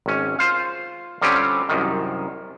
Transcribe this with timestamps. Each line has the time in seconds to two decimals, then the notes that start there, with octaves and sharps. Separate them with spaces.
0.06 G#1 C#4
0.39 F4 C5 F5
1.22 D3 G3 C4 C#4 F4 G4
1.69 C2 F#2 D#3